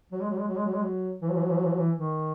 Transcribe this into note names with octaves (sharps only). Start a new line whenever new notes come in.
F#3
G#3
F#3
G#3
F#3
G#3
F#3
G#3
F#3
E3
F#3
E3
F#3
E3
F#3
E3
F#3
E3
D#3